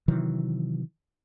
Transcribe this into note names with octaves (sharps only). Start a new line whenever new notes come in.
C3 D#3 E3 F#3